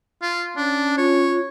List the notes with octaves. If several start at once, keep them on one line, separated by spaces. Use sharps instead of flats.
F4
C#4 D4
F4 C#5